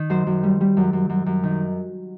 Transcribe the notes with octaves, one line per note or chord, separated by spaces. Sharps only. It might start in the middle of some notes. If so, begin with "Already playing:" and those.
Already playing: D#3
F#2 C5
F#2
G3
G3
F#2
F#2
F#2
F#2
D#3